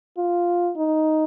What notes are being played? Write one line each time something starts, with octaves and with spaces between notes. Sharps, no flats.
F4
D#4